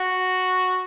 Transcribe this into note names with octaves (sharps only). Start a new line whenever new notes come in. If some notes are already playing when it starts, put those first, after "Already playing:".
Already playing: F#4